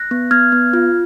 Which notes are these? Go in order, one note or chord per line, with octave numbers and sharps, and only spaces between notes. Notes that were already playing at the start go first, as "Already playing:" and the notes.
Already playing: F#6 A#6
B3
B3 F6 G#6
B3
F4